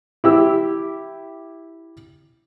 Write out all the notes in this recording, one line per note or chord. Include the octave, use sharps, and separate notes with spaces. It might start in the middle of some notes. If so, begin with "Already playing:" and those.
E4 G4 E6